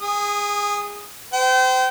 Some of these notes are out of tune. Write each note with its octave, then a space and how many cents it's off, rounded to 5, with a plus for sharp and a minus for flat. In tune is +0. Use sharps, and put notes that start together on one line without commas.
G#4 -20 D#6 +0
C5 -30 G5 -30